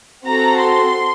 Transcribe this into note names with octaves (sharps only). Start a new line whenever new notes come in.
C4 F#4 A4 A#5
C6